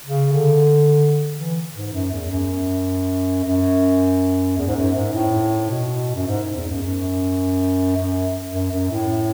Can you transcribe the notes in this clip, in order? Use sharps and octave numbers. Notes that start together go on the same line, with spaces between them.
C#3
D3
E3
G#2
F#2
E2
F#2
F#2
E2
G#2
F#2
G#2
A2
B2
F#2
G#2
E2
F#2
F#2
F#2
F#2
F#2
A2